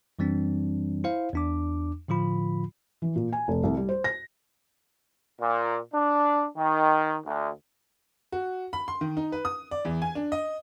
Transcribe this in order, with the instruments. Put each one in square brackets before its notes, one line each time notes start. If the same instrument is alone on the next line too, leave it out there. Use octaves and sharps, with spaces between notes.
[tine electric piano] F#2 E3 G3 C4 D4
E4 C5 F5
E2 D4 D6
A2 D3 F3 F4 B5
[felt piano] E3
A#2
G#5
F1
C2
G3
C5
A#6
[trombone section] A#2
D4
D#3
D2
[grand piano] F#4
B5
C6
D#3
D#4
B4
D#6
D5
E2
G#5
D4
D#5